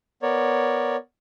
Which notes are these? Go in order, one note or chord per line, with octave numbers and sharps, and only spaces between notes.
B3 A#4 C#5 D5